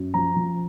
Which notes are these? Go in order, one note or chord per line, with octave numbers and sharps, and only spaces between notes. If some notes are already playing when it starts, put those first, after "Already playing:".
Already playing: F#2
F3 A#5
F3